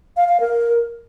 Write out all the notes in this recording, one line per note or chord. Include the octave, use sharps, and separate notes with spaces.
F5
F5
A#4